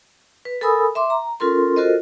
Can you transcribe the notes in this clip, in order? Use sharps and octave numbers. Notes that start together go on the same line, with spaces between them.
B4
A4 A#4 G#5 B5 D#6 E6
E5 C6 D6
A#5
C#4 F4 A4 A#4 C6
F4 F#4 A4 A#4 C5 D#5